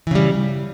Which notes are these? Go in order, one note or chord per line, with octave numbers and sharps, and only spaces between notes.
C#3 E3 G3